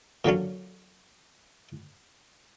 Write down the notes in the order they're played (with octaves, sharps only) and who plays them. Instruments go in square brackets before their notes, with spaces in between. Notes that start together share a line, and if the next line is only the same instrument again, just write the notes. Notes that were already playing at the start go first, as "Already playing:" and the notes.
[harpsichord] A#2 D3 F#3 C#4